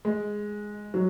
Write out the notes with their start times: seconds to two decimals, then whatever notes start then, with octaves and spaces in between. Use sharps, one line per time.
0.05 G#3
0.94 F#3